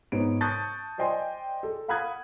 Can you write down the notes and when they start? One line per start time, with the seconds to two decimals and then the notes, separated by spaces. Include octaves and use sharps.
0.12 G#2 B3 D#4 C#5 D7
0.41 A5 C#6 D#6 F#6 G6 A6
0.98 C5 D5 D#5 G5 G#5 C6
1.63 A4
1.88 F5 F#5 B5 D#6 F#6 G#6